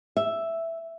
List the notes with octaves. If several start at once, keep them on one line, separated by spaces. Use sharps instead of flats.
E5